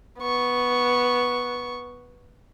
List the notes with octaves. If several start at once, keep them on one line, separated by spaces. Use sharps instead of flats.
B3 C#6